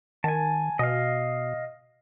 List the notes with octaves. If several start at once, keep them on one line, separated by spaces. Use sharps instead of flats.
D#3 G#5 A5
B2 D#5 F5